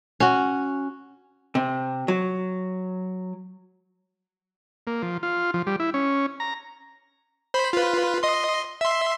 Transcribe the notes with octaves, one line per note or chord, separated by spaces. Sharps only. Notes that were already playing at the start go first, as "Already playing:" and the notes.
C#4 F#4
C3
F#3
A#3
F3
F4
F3
G3
E4
C#4
A#5
C5 B5
F4 B4
D#5 C6
E5 C6